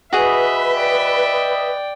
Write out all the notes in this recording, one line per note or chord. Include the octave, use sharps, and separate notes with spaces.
F#4 G#4 B4 D#5 E5
D5 G5